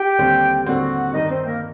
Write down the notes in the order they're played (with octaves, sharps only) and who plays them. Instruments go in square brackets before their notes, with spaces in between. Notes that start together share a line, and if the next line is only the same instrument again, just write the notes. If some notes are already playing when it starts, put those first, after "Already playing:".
Already playing: [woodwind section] G4 G5
[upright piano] D#2 D3 G3 C4
[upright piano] D#2 D3 G3 C4 [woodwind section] F#4 F#5
[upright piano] G2 D#3 G3 [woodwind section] D#4 D#5
[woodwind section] C4 C5
A#3 A#4